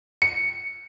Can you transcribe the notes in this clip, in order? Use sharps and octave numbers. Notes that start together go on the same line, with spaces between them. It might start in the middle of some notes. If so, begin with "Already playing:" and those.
C#7